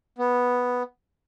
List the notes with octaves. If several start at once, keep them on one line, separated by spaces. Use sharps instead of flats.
B3